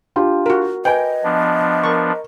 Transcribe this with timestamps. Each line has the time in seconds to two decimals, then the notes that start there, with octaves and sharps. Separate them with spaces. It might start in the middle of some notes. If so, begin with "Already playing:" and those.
0.16 D4 F4 G4
0.46 F#4 A#4
0.85 B4 D#5 G5 G#5
1.24 F3 B3 D4
1.84 A#4 C#6